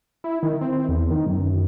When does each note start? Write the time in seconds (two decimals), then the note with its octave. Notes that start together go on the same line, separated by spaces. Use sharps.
0.24 E4
0.43 D#3
0.61 C4
0.89 E2
1.10 D#3
1.26 F#2